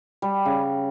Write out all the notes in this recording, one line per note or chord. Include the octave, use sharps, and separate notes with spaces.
G3
C#3